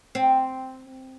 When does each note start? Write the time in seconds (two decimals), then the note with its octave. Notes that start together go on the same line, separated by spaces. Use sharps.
0.15 C4